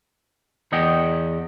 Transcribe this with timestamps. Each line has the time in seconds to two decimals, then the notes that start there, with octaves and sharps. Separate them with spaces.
0.72 E2 D#5 F#5 G5